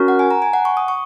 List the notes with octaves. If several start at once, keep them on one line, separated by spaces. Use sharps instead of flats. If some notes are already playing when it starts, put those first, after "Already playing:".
Already playing: C#4 F#4 A#4
F#5
G#5
A#5
G#5
F#5
C#6
D#6
C#6